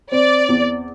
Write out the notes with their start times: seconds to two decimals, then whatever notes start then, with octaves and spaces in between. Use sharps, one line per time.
0.12 C4 D5
0.49 E2